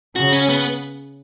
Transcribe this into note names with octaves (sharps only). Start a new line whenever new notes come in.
C#3 F#4
C#4
B3